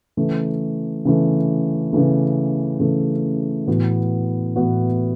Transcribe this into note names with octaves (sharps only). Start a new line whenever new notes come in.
C#3 E3 A3
C#3 E3 A3
C#3 E3 A3
C#3 E3 A3
A2 E3 B3 F#4
A2 E3 B3 F#4